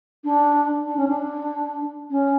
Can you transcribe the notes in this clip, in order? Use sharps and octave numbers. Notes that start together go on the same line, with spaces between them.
D4
D4
C#4
D4
C#4